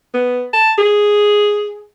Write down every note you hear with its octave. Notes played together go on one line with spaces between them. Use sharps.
B3
A5
G#4